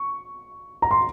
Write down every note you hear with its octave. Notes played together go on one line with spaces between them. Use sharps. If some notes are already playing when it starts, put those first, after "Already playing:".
Already playing: C#6
A#5
C6